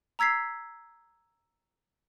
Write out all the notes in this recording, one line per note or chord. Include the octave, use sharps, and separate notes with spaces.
A#5 E6 G#6 B6 C7